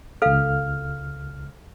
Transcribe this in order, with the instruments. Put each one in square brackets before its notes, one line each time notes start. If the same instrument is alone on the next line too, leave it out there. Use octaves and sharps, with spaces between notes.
[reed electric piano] C#2 F6 [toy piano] A4 F5